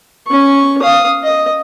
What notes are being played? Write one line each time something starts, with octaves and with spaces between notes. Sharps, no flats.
C#4 C#6
F5 D#6
D#5